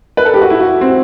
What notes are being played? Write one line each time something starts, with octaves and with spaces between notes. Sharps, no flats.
B4
A4
G4
F#4
E4
F#4
C4